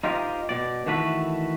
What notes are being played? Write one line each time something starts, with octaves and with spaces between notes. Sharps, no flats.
D#4 F4 G4 A#4 C5 D#5
B2 D5
D#3 E3 A3 F#4 A4 B4